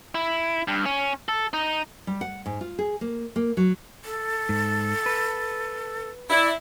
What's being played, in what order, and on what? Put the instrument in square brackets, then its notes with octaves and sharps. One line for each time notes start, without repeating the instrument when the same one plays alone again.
[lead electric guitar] E4
G2
C#4
A4
D#4
[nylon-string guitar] G3
F#5
G#2
F4
G#4
A#3
A#3
F#3
[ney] A4
[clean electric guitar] G#2
B4
[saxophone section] E4 [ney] D5